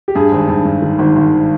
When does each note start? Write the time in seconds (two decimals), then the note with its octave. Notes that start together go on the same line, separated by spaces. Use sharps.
0.08 G4
0.15 G2 G#4
0.32 G#1
0.49 G2
0.65 G2
0.82 D#3
0.99 G#1
1.16 G#1